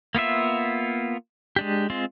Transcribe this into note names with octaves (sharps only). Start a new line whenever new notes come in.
A#3 B3 F4 E5
G#3 D4 G4
G#3 C4 F4